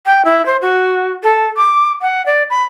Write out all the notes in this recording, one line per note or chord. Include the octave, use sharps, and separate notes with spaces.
G5
E4
C5
F#4
A4
D6
F#5
D5
B5